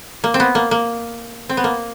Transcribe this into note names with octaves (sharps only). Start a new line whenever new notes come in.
A#3
C4
B3
A#3
A#3
C4
B3
A#3